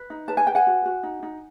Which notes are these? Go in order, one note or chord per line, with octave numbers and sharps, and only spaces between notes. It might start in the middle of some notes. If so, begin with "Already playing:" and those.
Already playing: B4
D#4
B4 A5
G#5
B4 G5
F#5 G#5
F#4
F#4
D#4
D#4